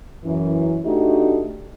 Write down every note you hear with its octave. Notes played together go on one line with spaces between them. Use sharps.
F#2 E3
A3 D4 D#4 F#4 G4